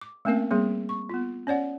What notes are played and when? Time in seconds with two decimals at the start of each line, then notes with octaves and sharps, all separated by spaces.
0.01 D6
0.25 A3 A#3 C4 C#4 A#4 F5
0.51 G3 A#3 C4 G#4
0.89 C#6
1.09 B3 F4
1.47 C#4 C#5 D5 F#5